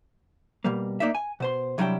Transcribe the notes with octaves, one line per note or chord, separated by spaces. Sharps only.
B2 G3 A#3
A#3 D#4 D5 E5
G#5
B2 C5 C6
C2 F#3 G3 D4 E4 G5